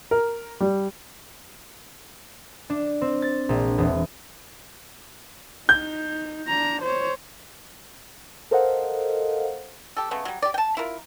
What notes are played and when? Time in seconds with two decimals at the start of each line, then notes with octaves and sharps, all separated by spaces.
0.11 A#4
0.60 G3
2.70 D4
3.01 C4
3.22 A6
3.49 A#1
3.78 E1
5.69 D#4 G6
6.48 D4 A#5
6.82 C5 C#5
8.51 A4 A#4 C5 D#5 F5 F#5
9.97 G4 A4
10.11 C#3 A3 B3
10.25 F#3 G3
10.42 G4 D5
10.54 G5 A5
10.77 E4 F4 A#4